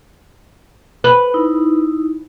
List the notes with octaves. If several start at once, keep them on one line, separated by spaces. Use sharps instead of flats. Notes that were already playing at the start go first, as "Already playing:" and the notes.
B4
D#4 E4